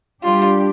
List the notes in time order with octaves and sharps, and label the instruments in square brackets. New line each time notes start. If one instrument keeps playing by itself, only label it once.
[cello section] G3 D4 G4 [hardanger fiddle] F4